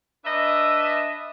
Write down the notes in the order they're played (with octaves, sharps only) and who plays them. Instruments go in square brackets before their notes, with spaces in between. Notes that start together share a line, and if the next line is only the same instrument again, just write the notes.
[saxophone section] D4 B4 D#5 E5